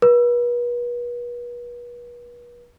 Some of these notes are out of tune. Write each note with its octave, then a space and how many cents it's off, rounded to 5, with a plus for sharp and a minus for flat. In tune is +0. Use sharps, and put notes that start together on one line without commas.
B4 -40